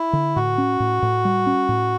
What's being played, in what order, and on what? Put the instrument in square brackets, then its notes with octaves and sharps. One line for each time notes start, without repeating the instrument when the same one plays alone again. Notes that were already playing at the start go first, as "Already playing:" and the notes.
Already playing: [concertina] E4
[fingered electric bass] D3
[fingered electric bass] A2 [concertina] F#4
[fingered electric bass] C#4
A2
A2
G3
C#4
A2